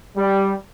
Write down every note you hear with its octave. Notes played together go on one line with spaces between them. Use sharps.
G3